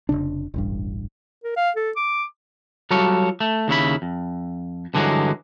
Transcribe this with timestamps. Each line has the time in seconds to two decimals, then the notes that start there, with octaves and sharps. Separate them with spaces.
0.09 F1 B1 C#3 D4
0.54 E1 A1 G2
1.44 A#4
1.57 F5
1.76 A4
1.97 D6
2.91 F#3 G3 F4 A4 C#5
3.40 A3
3.68 D#2 C#3 E4 B5
4.02 F2
4.94 G2 D3 E3 F#3 G#3